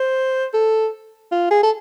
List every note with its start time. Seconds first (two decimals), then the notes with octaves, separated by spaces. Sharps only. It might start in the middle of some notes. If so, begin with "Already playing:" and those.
Already playing: C5
0.54 A4
1.32 F4
1.51 G#4
1.63 A4